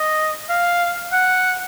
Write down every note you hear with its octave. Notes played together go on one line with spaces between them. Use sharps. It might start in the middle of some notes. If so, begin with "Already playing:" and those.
Already playing: D#5
F5
F#5